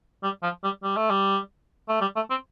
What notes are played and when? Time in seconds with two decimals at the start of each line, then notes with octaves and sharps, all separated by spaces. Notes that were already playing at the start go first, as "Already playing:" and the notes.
0.23 G3
0.43 F3
0.64 G3
0.83 G3
0.97 A3
1.10 G3
1.89 A3
2.01 G3
2.16 A3
2.30 C4